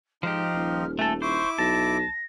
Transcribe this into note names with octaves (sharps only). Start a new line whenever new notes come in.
G#2 F3 D#4 G4 F6
D#1
A3 A4 G#5
E4 C5 C#6 D6
B1 A5 A#6